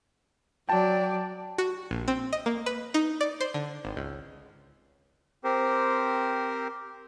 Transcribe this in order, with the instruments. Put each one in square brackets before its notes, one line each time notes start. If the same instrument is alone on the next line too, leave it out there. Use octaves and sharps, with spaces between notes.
[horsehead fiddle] F#3 D5 [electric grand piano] G5 A5
[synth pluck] F#4
A#1
C4
D#5
A#3
B4
D#4
D5
C5
D3
G#1
C#2
[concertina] C4 G4 A#4 C5